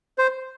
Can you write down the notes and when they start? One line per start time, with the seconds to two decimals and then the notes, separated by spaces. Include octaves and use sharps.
0.18 C5